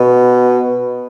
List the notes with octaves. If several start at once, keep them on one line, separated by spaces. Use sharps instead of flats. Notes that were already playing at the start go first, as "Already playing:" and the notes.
Already playing: B2